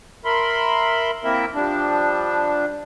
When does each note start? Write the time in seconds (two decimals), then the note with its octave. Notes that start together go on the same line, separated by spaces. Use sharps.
0.25 A#4 E5 B5 C6
1.24 A#3 C4 E4 A#4 E5
1.54 F3 G3 D4